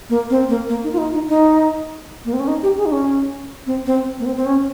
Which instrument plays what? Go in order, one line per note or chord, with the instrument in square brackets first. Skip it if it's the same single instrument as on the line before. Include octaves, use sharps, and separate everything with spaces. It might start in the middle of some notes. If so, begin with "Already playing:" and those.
[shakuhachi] A#3
C4
A#3
A#3
D#4
F4
D#4
D#4
D#4
A#3
C4
C#4
D#4
G4
G#4
D#4
C#4
C4
C4
A#3
C4
C4
C#4